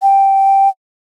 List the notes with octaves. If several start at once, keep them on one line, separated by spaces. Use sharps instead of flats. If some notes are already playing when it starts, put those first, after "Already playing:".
G5